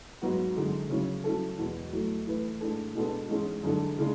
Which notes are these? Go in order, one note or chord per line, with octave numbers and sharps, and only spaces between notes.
G#2 F#3 B3 F#4
F#2 D3 G#3
C#3 F#3 C#4
F#3 C#4 E4 A4
E2 B2 G#3 B3
F#3 A3 E4
E3 A3 E4 B4
A2 G#3 D4 A4
B2 G#3 B3 D4 A4
G#2 E3 G#3 C#4 G#4
F#2 D3 G#3 D4 A4
C#3 G#3 D4